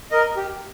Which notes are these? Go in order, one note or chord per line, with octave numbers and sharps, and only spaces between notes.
A#4 D#5
G4